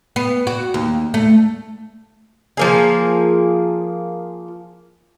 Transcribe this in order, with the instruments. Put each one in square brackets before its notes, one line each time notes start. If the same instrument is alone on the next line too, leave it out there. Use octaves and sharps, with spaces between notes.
[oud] B3
F#4
D#2
A3
[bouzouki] F3 A#3 G#4